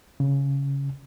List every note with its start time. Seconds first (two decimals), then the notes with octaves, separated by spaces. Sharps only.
0.20 C#3